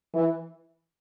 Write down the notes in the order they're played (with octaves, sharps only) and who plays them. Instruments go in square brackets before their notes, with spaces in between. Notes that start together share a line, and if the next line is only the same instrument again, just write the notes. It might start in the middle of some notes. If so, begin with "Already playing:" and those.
[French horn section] E3